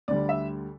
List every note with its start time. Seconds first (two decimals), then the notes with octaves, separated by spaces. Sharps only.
0.08 D2 D3 G3 D5
0.29 E5